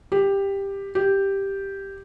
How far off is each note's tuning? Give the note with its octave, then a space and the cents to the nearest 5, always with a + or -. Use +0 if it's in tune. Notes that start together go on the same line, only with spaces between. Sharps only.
G4 +10
G4 +0